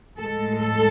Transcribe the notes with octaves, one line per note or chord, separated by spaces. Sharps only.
A2 G#3 A4
A4